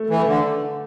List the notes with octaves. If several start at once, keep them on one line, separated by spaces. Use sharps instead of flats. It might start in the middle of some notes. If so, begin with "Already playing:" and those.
Already playing: A3
E3
A3
D3